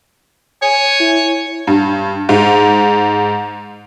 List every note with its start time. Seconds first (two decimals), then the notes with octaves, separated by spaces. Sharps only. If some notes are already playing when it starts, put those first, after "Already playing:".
0.62 C#5 G#5
1.00 E4
1.67 G2
2.29 G#2